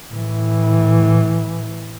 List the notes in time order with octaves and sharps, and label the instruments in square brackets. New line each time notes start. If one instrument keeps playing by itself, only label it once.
[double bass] A2 E3